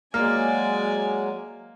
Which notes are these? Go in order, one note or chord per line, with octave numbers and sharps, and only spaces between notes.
F#3 G#3 A#3 D5 G#5 F6